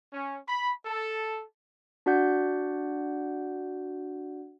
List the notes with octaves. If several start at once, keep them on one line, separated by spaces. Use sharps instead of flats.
C#4
B5
A4
D4 F#4 D5 F#5 G6